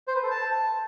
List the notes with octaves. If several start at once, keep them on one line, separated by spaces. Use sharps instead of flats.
C5
B4
A4
A5